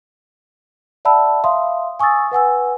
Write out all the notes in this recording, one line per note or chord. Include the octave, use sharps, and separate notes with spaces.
D5 E5 F#5 A5 B5 E6
E5 F5 C6 D#6
G#5 C#6 D#6 E6 A6
B4 F#5 G#5 E6